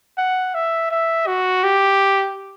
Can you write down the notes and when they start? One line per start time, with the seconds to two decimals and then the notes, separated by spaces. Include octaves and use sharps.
0.18 F#5
0.55 E5
0.91 E5
1.27 F#4
1.64 G4